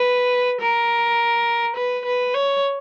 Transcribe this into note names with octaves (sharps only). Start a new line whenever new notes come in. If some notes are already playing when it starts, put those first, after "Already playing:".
Already playing: B4
A#4
B4
B4
C#5